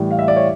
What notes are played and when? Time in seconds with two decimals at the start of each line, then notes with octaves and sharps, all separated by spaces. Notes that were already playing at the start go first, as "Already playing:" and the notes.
Already playing: A2 E3 G3
0.11 F5
0.19 E5
0.28 D5
0.36 C#5